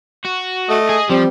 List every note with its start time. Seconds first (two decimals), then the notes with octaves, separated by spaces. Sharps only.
0.25 F#4
0.69 A3 D#5
0.89 G#4
1.10 F3 G3 C4